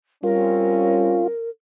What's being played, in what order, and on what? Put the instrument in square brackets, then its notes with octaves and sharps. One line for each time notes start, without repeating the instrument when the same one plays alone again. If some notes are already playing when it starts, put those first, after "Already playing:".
[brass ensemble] G3 C4 C#4 [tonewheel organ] F4 [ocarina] A#4